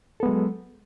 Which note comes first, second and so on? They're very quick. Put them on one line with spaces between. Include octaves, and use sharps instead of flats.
A4 B3 G#3 F#3